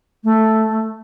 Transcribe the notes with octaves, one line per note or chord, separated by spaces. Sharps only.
A3